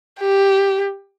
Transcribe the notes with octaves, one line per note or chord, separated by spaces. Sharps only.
G4